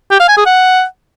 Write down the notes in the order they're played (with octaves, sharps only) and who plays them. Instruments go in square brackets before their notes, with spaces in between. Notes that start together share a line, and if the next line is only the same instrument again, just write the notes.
[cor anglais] G4
F5
G#5
G#4
F#5